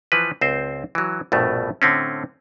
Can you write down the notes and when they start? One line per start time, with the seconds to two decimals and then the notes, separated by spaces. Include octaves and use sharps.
0.12 E3 F3 B4
0.41 C#2 C4 C5
0.95 E3 F#3
1.32 A#1 G2 B2 A3
1.82 A2 D3 C4 C#4